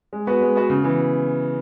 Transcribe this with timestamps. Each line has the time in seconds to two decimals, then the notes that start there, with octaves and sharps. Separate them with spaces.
0.13 G#3
0.27 B3 F#4 B4
0.41 G#3
0.56 B3 F#4 B4
0.70 C#3
0.84 E3 B3